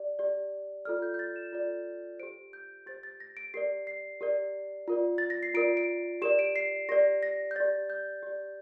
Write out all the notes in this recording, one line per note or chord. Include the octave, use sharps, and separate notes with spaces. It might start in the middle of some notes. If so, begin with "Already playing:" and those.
Already playing: G4 D5
G4 D5
F4 A4 D5 F6
G6
G6
A6
E7
F4 A4 D5
G4 C5 D7
G6
G4 C5 A6
A6
A#6
D7
G4 A#4 D5 C7
C7
G4 A#4 D5
F4 A#4 D5
A6
A#6
C7
F4 A#4 D5 D7
D7
G4 A#4 D5 E7
D7
C7
G4 A#4 D5 A#6
A#6
G6
G4 D5 A6
G6
G4 D5